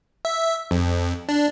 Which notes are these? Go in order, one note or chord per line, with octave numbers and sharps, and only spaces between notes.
E5
F2
D4